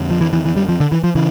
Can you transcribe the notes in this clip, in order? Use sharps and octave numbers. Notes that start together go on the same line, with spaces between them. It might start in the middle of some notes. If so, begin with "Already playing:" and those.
Already playing: F2 D3
F3
E3
E3
E3
G3
F3
D3
E3
F3
C#3 E3